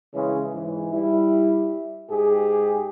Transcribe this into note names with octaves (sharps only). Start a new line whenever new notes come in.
C#3 E3 G#3 C#4
G#2 E3
G3 E4
G#2 G4 G#4